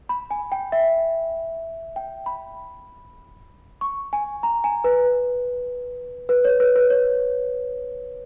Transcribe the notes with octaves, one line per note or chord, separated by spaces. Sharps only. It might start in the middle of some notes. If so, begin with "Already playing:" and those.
B5
G#5
G5
E5
G5
B5
C#6
G#5
A#5
G#5
B4
B4
C#5
B4
B4
C#5